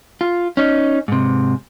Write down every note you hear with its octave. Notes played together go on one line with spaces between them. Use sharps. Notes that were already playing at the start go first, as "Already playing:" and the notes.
F4
C#4 D#4
G#2 C3